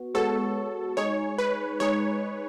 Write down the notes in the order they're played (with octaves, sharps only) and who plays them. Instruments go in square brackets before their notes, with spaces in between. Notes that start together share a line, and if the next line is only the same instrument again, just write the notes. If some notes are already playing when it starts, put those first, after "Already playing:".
Already playing: [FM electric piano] B3 F#4
[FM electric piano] G#3 B3 F#4 C#5 [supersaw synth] A4
[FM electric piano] G#3 D#4 G#4 [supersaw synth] C#5
[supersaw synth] B4
[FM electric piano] G#3 D#4 G#4 [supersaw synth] C#5